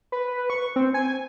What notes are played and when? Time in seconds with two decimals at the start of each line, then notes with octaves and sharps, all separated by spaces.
0.12 B4
0.50 C#6
0.76 C4
0.94 G#5